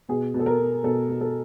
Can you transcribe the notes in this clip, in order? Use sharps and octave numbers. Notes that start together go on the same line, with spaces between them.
B2 G#4
B2
A4
A#4
B2
B2 A4
B2
A4